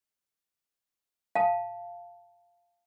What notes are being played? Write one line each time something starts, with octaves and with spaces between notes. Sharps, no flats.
F5 A5